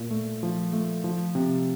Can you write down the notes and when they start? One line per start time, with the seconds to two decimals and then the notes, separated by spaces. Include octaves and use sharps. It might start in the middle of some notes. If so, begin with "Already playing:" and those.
Already playing: A#2
0.11 A3
0.43 F3
0.73 A3
1.04 F3
1.35 C3